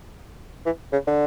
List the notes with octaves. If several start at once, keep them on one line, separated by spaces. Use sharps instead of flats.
E3
C#3
D3